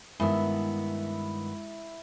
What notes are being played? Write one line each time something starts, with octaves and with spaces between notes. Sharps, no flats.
G2 D#3 G#3 B3 E4 E6